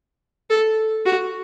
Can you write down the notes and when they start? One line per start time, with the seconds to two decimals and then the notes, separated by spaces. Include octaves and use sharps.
0.50 A4
1.06 F#4